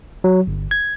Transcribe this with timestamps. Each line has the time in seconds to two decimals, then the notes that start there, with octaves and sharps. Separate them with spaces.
0.24 F#3
0.47 G1
0.71 G#6